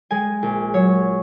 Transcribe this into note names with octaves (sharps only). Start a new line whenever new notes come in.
G#3 G#5
A#1
F#3 C#5